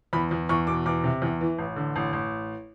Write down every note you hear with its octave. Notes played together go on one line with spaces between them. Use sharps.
E2 B5
E2
E2 C#6
B2 D6
E2 D6
C3
E2
E3
A1
D3
A1
A1